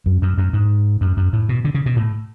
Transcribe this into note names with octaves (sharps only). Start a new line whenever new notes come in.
F#2
F#2
F#2
G#2
F#2
F#2
A2
B2
D3
C#3
B2
A2